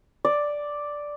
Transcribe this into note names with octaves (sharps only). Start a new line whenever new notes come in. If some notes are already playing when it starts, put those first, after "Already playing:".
D5